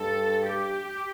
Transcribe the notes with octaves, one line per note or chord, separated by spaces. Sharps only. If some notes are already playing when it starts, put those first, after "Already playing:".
Already playing: G2 A4
G4